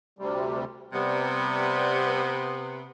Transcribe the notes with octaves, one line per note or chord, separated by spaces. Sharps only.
D2 C3 G3
C3 G3 B3